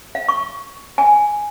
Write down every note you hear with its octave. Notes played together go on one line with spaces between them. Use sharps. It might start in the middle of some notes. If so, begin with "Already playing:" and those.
F5
C#6
G#5